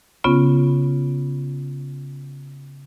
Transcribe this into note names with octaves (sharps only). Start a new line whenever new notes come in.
C#3 B3 C#4 F4